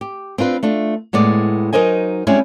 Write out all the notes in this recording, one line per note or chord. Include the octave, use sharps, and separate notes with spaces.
G4
C4 D4 F4 B4
A3 D4 F4
A2 G#3 B3 D5
F#3 D#4 A#4 C5 D#5 G#5
G3 G#3 C4 C#4 E4